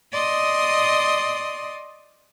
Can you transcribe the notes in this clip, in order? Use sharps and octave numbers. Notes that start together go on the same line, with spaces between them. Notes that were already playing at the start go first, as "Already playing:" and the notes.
D5 D#5 C6 D#6